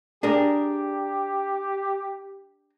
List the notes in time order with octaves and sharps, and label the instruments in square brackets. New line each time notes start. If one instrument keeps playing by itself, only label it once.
[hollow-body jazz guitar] D4 G#4 A#4 [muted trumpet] G4